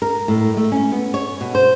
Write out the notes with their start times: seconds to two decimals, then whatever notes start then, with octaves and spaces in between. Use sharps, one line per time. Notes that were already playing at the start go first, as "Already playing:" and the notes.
0.02 A#4
0.28 A2
0.57 A3
0.72 C#4
0.92 B3
1.14 C#5
1.41 B2
1.55 C5